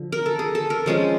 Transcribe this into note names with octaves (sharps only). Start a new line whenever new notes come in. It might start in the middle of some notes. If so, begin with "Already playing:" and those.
Already playing: D3 F3
A#4
A4
G#4
A4
A#4
F3 G#3 C#4 F4